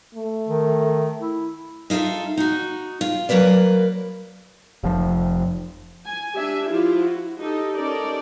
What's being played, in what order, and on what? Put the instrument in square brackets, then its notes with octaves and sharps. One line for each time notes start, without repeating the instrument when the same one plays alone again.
[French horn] A3
[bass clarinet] D#3
E4
[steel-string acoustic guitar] D#4 F4 G4 A4 E5
D#4 F#4
F4
F#3 A#3 A#4 B4 D5
[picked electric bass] F1 F3
[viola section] G#5
D4 G4 E5 G#5
F3 E4 F4 G4
F#4
D#4 G4 A4
C#4 D#4 G4 A4 A#4 D5